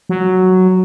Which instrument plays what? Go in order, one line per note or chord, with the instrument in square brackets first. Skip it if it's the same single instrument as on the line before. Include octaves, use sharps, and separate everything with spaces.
[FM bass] F#3